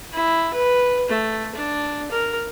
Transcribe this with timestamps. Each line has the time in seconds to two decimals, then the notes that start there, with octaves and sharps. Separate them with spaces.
0.13 E4
0.53 B4
1.09 A3
1.55 D4
2.11 A#4